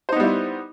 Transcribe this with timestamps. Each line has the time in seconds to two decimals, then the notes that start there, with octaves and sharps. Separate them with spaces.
0.09 C5
0.12 D#4
0.16 B3
0.20 G3
0.24 E4